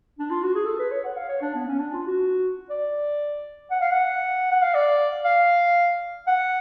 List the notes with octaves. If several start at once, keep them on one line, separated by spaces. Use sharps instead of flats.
D4
F4
F#4
G#4
A4
B4
C#5
F#5
F5
C#5
D4
B3
C#4
D4
F4
F#4
D5
F#5
F5
F#5
F#5
F5
D5
F5
F#5